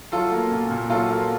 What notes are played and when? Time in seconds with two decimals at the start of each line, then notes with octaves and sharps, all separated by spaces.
0.12 F#3 F4 A4
0.32 A#3
0.51 A#2
0.71 A#2
0.90 F#3 F4 A4
1.10 A#3